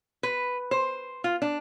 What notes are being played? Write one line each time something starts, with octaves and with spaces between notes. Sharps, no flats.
B4
C5
F4
D4